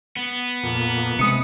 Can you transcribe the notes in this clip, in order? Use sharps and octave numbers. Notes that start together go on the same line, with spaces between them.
B3
F2 A#2
C3 G#3 D#6 C#7